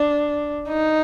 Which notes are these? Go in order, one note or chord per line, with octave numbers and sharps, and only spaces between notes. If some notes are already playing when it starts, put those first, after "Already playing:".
Already playing: D4
D#4